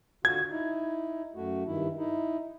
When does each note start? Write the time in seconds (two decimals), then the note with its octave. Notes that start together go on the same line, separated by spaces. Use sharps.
0.25 D3 F4 F#4 G#6
0.51 D#4 E4
1.35 F#2 A3 F#4
1.66 G2 D#3 E4
1.97 D#4 E4